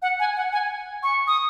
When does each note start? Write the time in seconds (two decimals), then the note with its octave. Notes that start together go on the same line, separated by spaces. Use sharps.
0.02 F#5
0.20 G#5
0.36 F#5
0.52 G#5
1.03 C#6
1.27 D#6